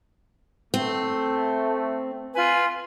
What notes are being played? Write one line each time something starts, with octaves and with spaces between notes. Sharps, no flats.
A3 C4
F4 B4 G#5